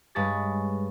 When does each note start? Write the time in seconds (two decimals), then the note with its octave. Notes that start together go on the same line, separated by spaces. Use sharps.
0.15 G2 G#3 B4 C#5 C#6 A6